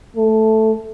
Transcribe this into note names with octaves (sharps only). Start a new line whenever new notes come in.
A3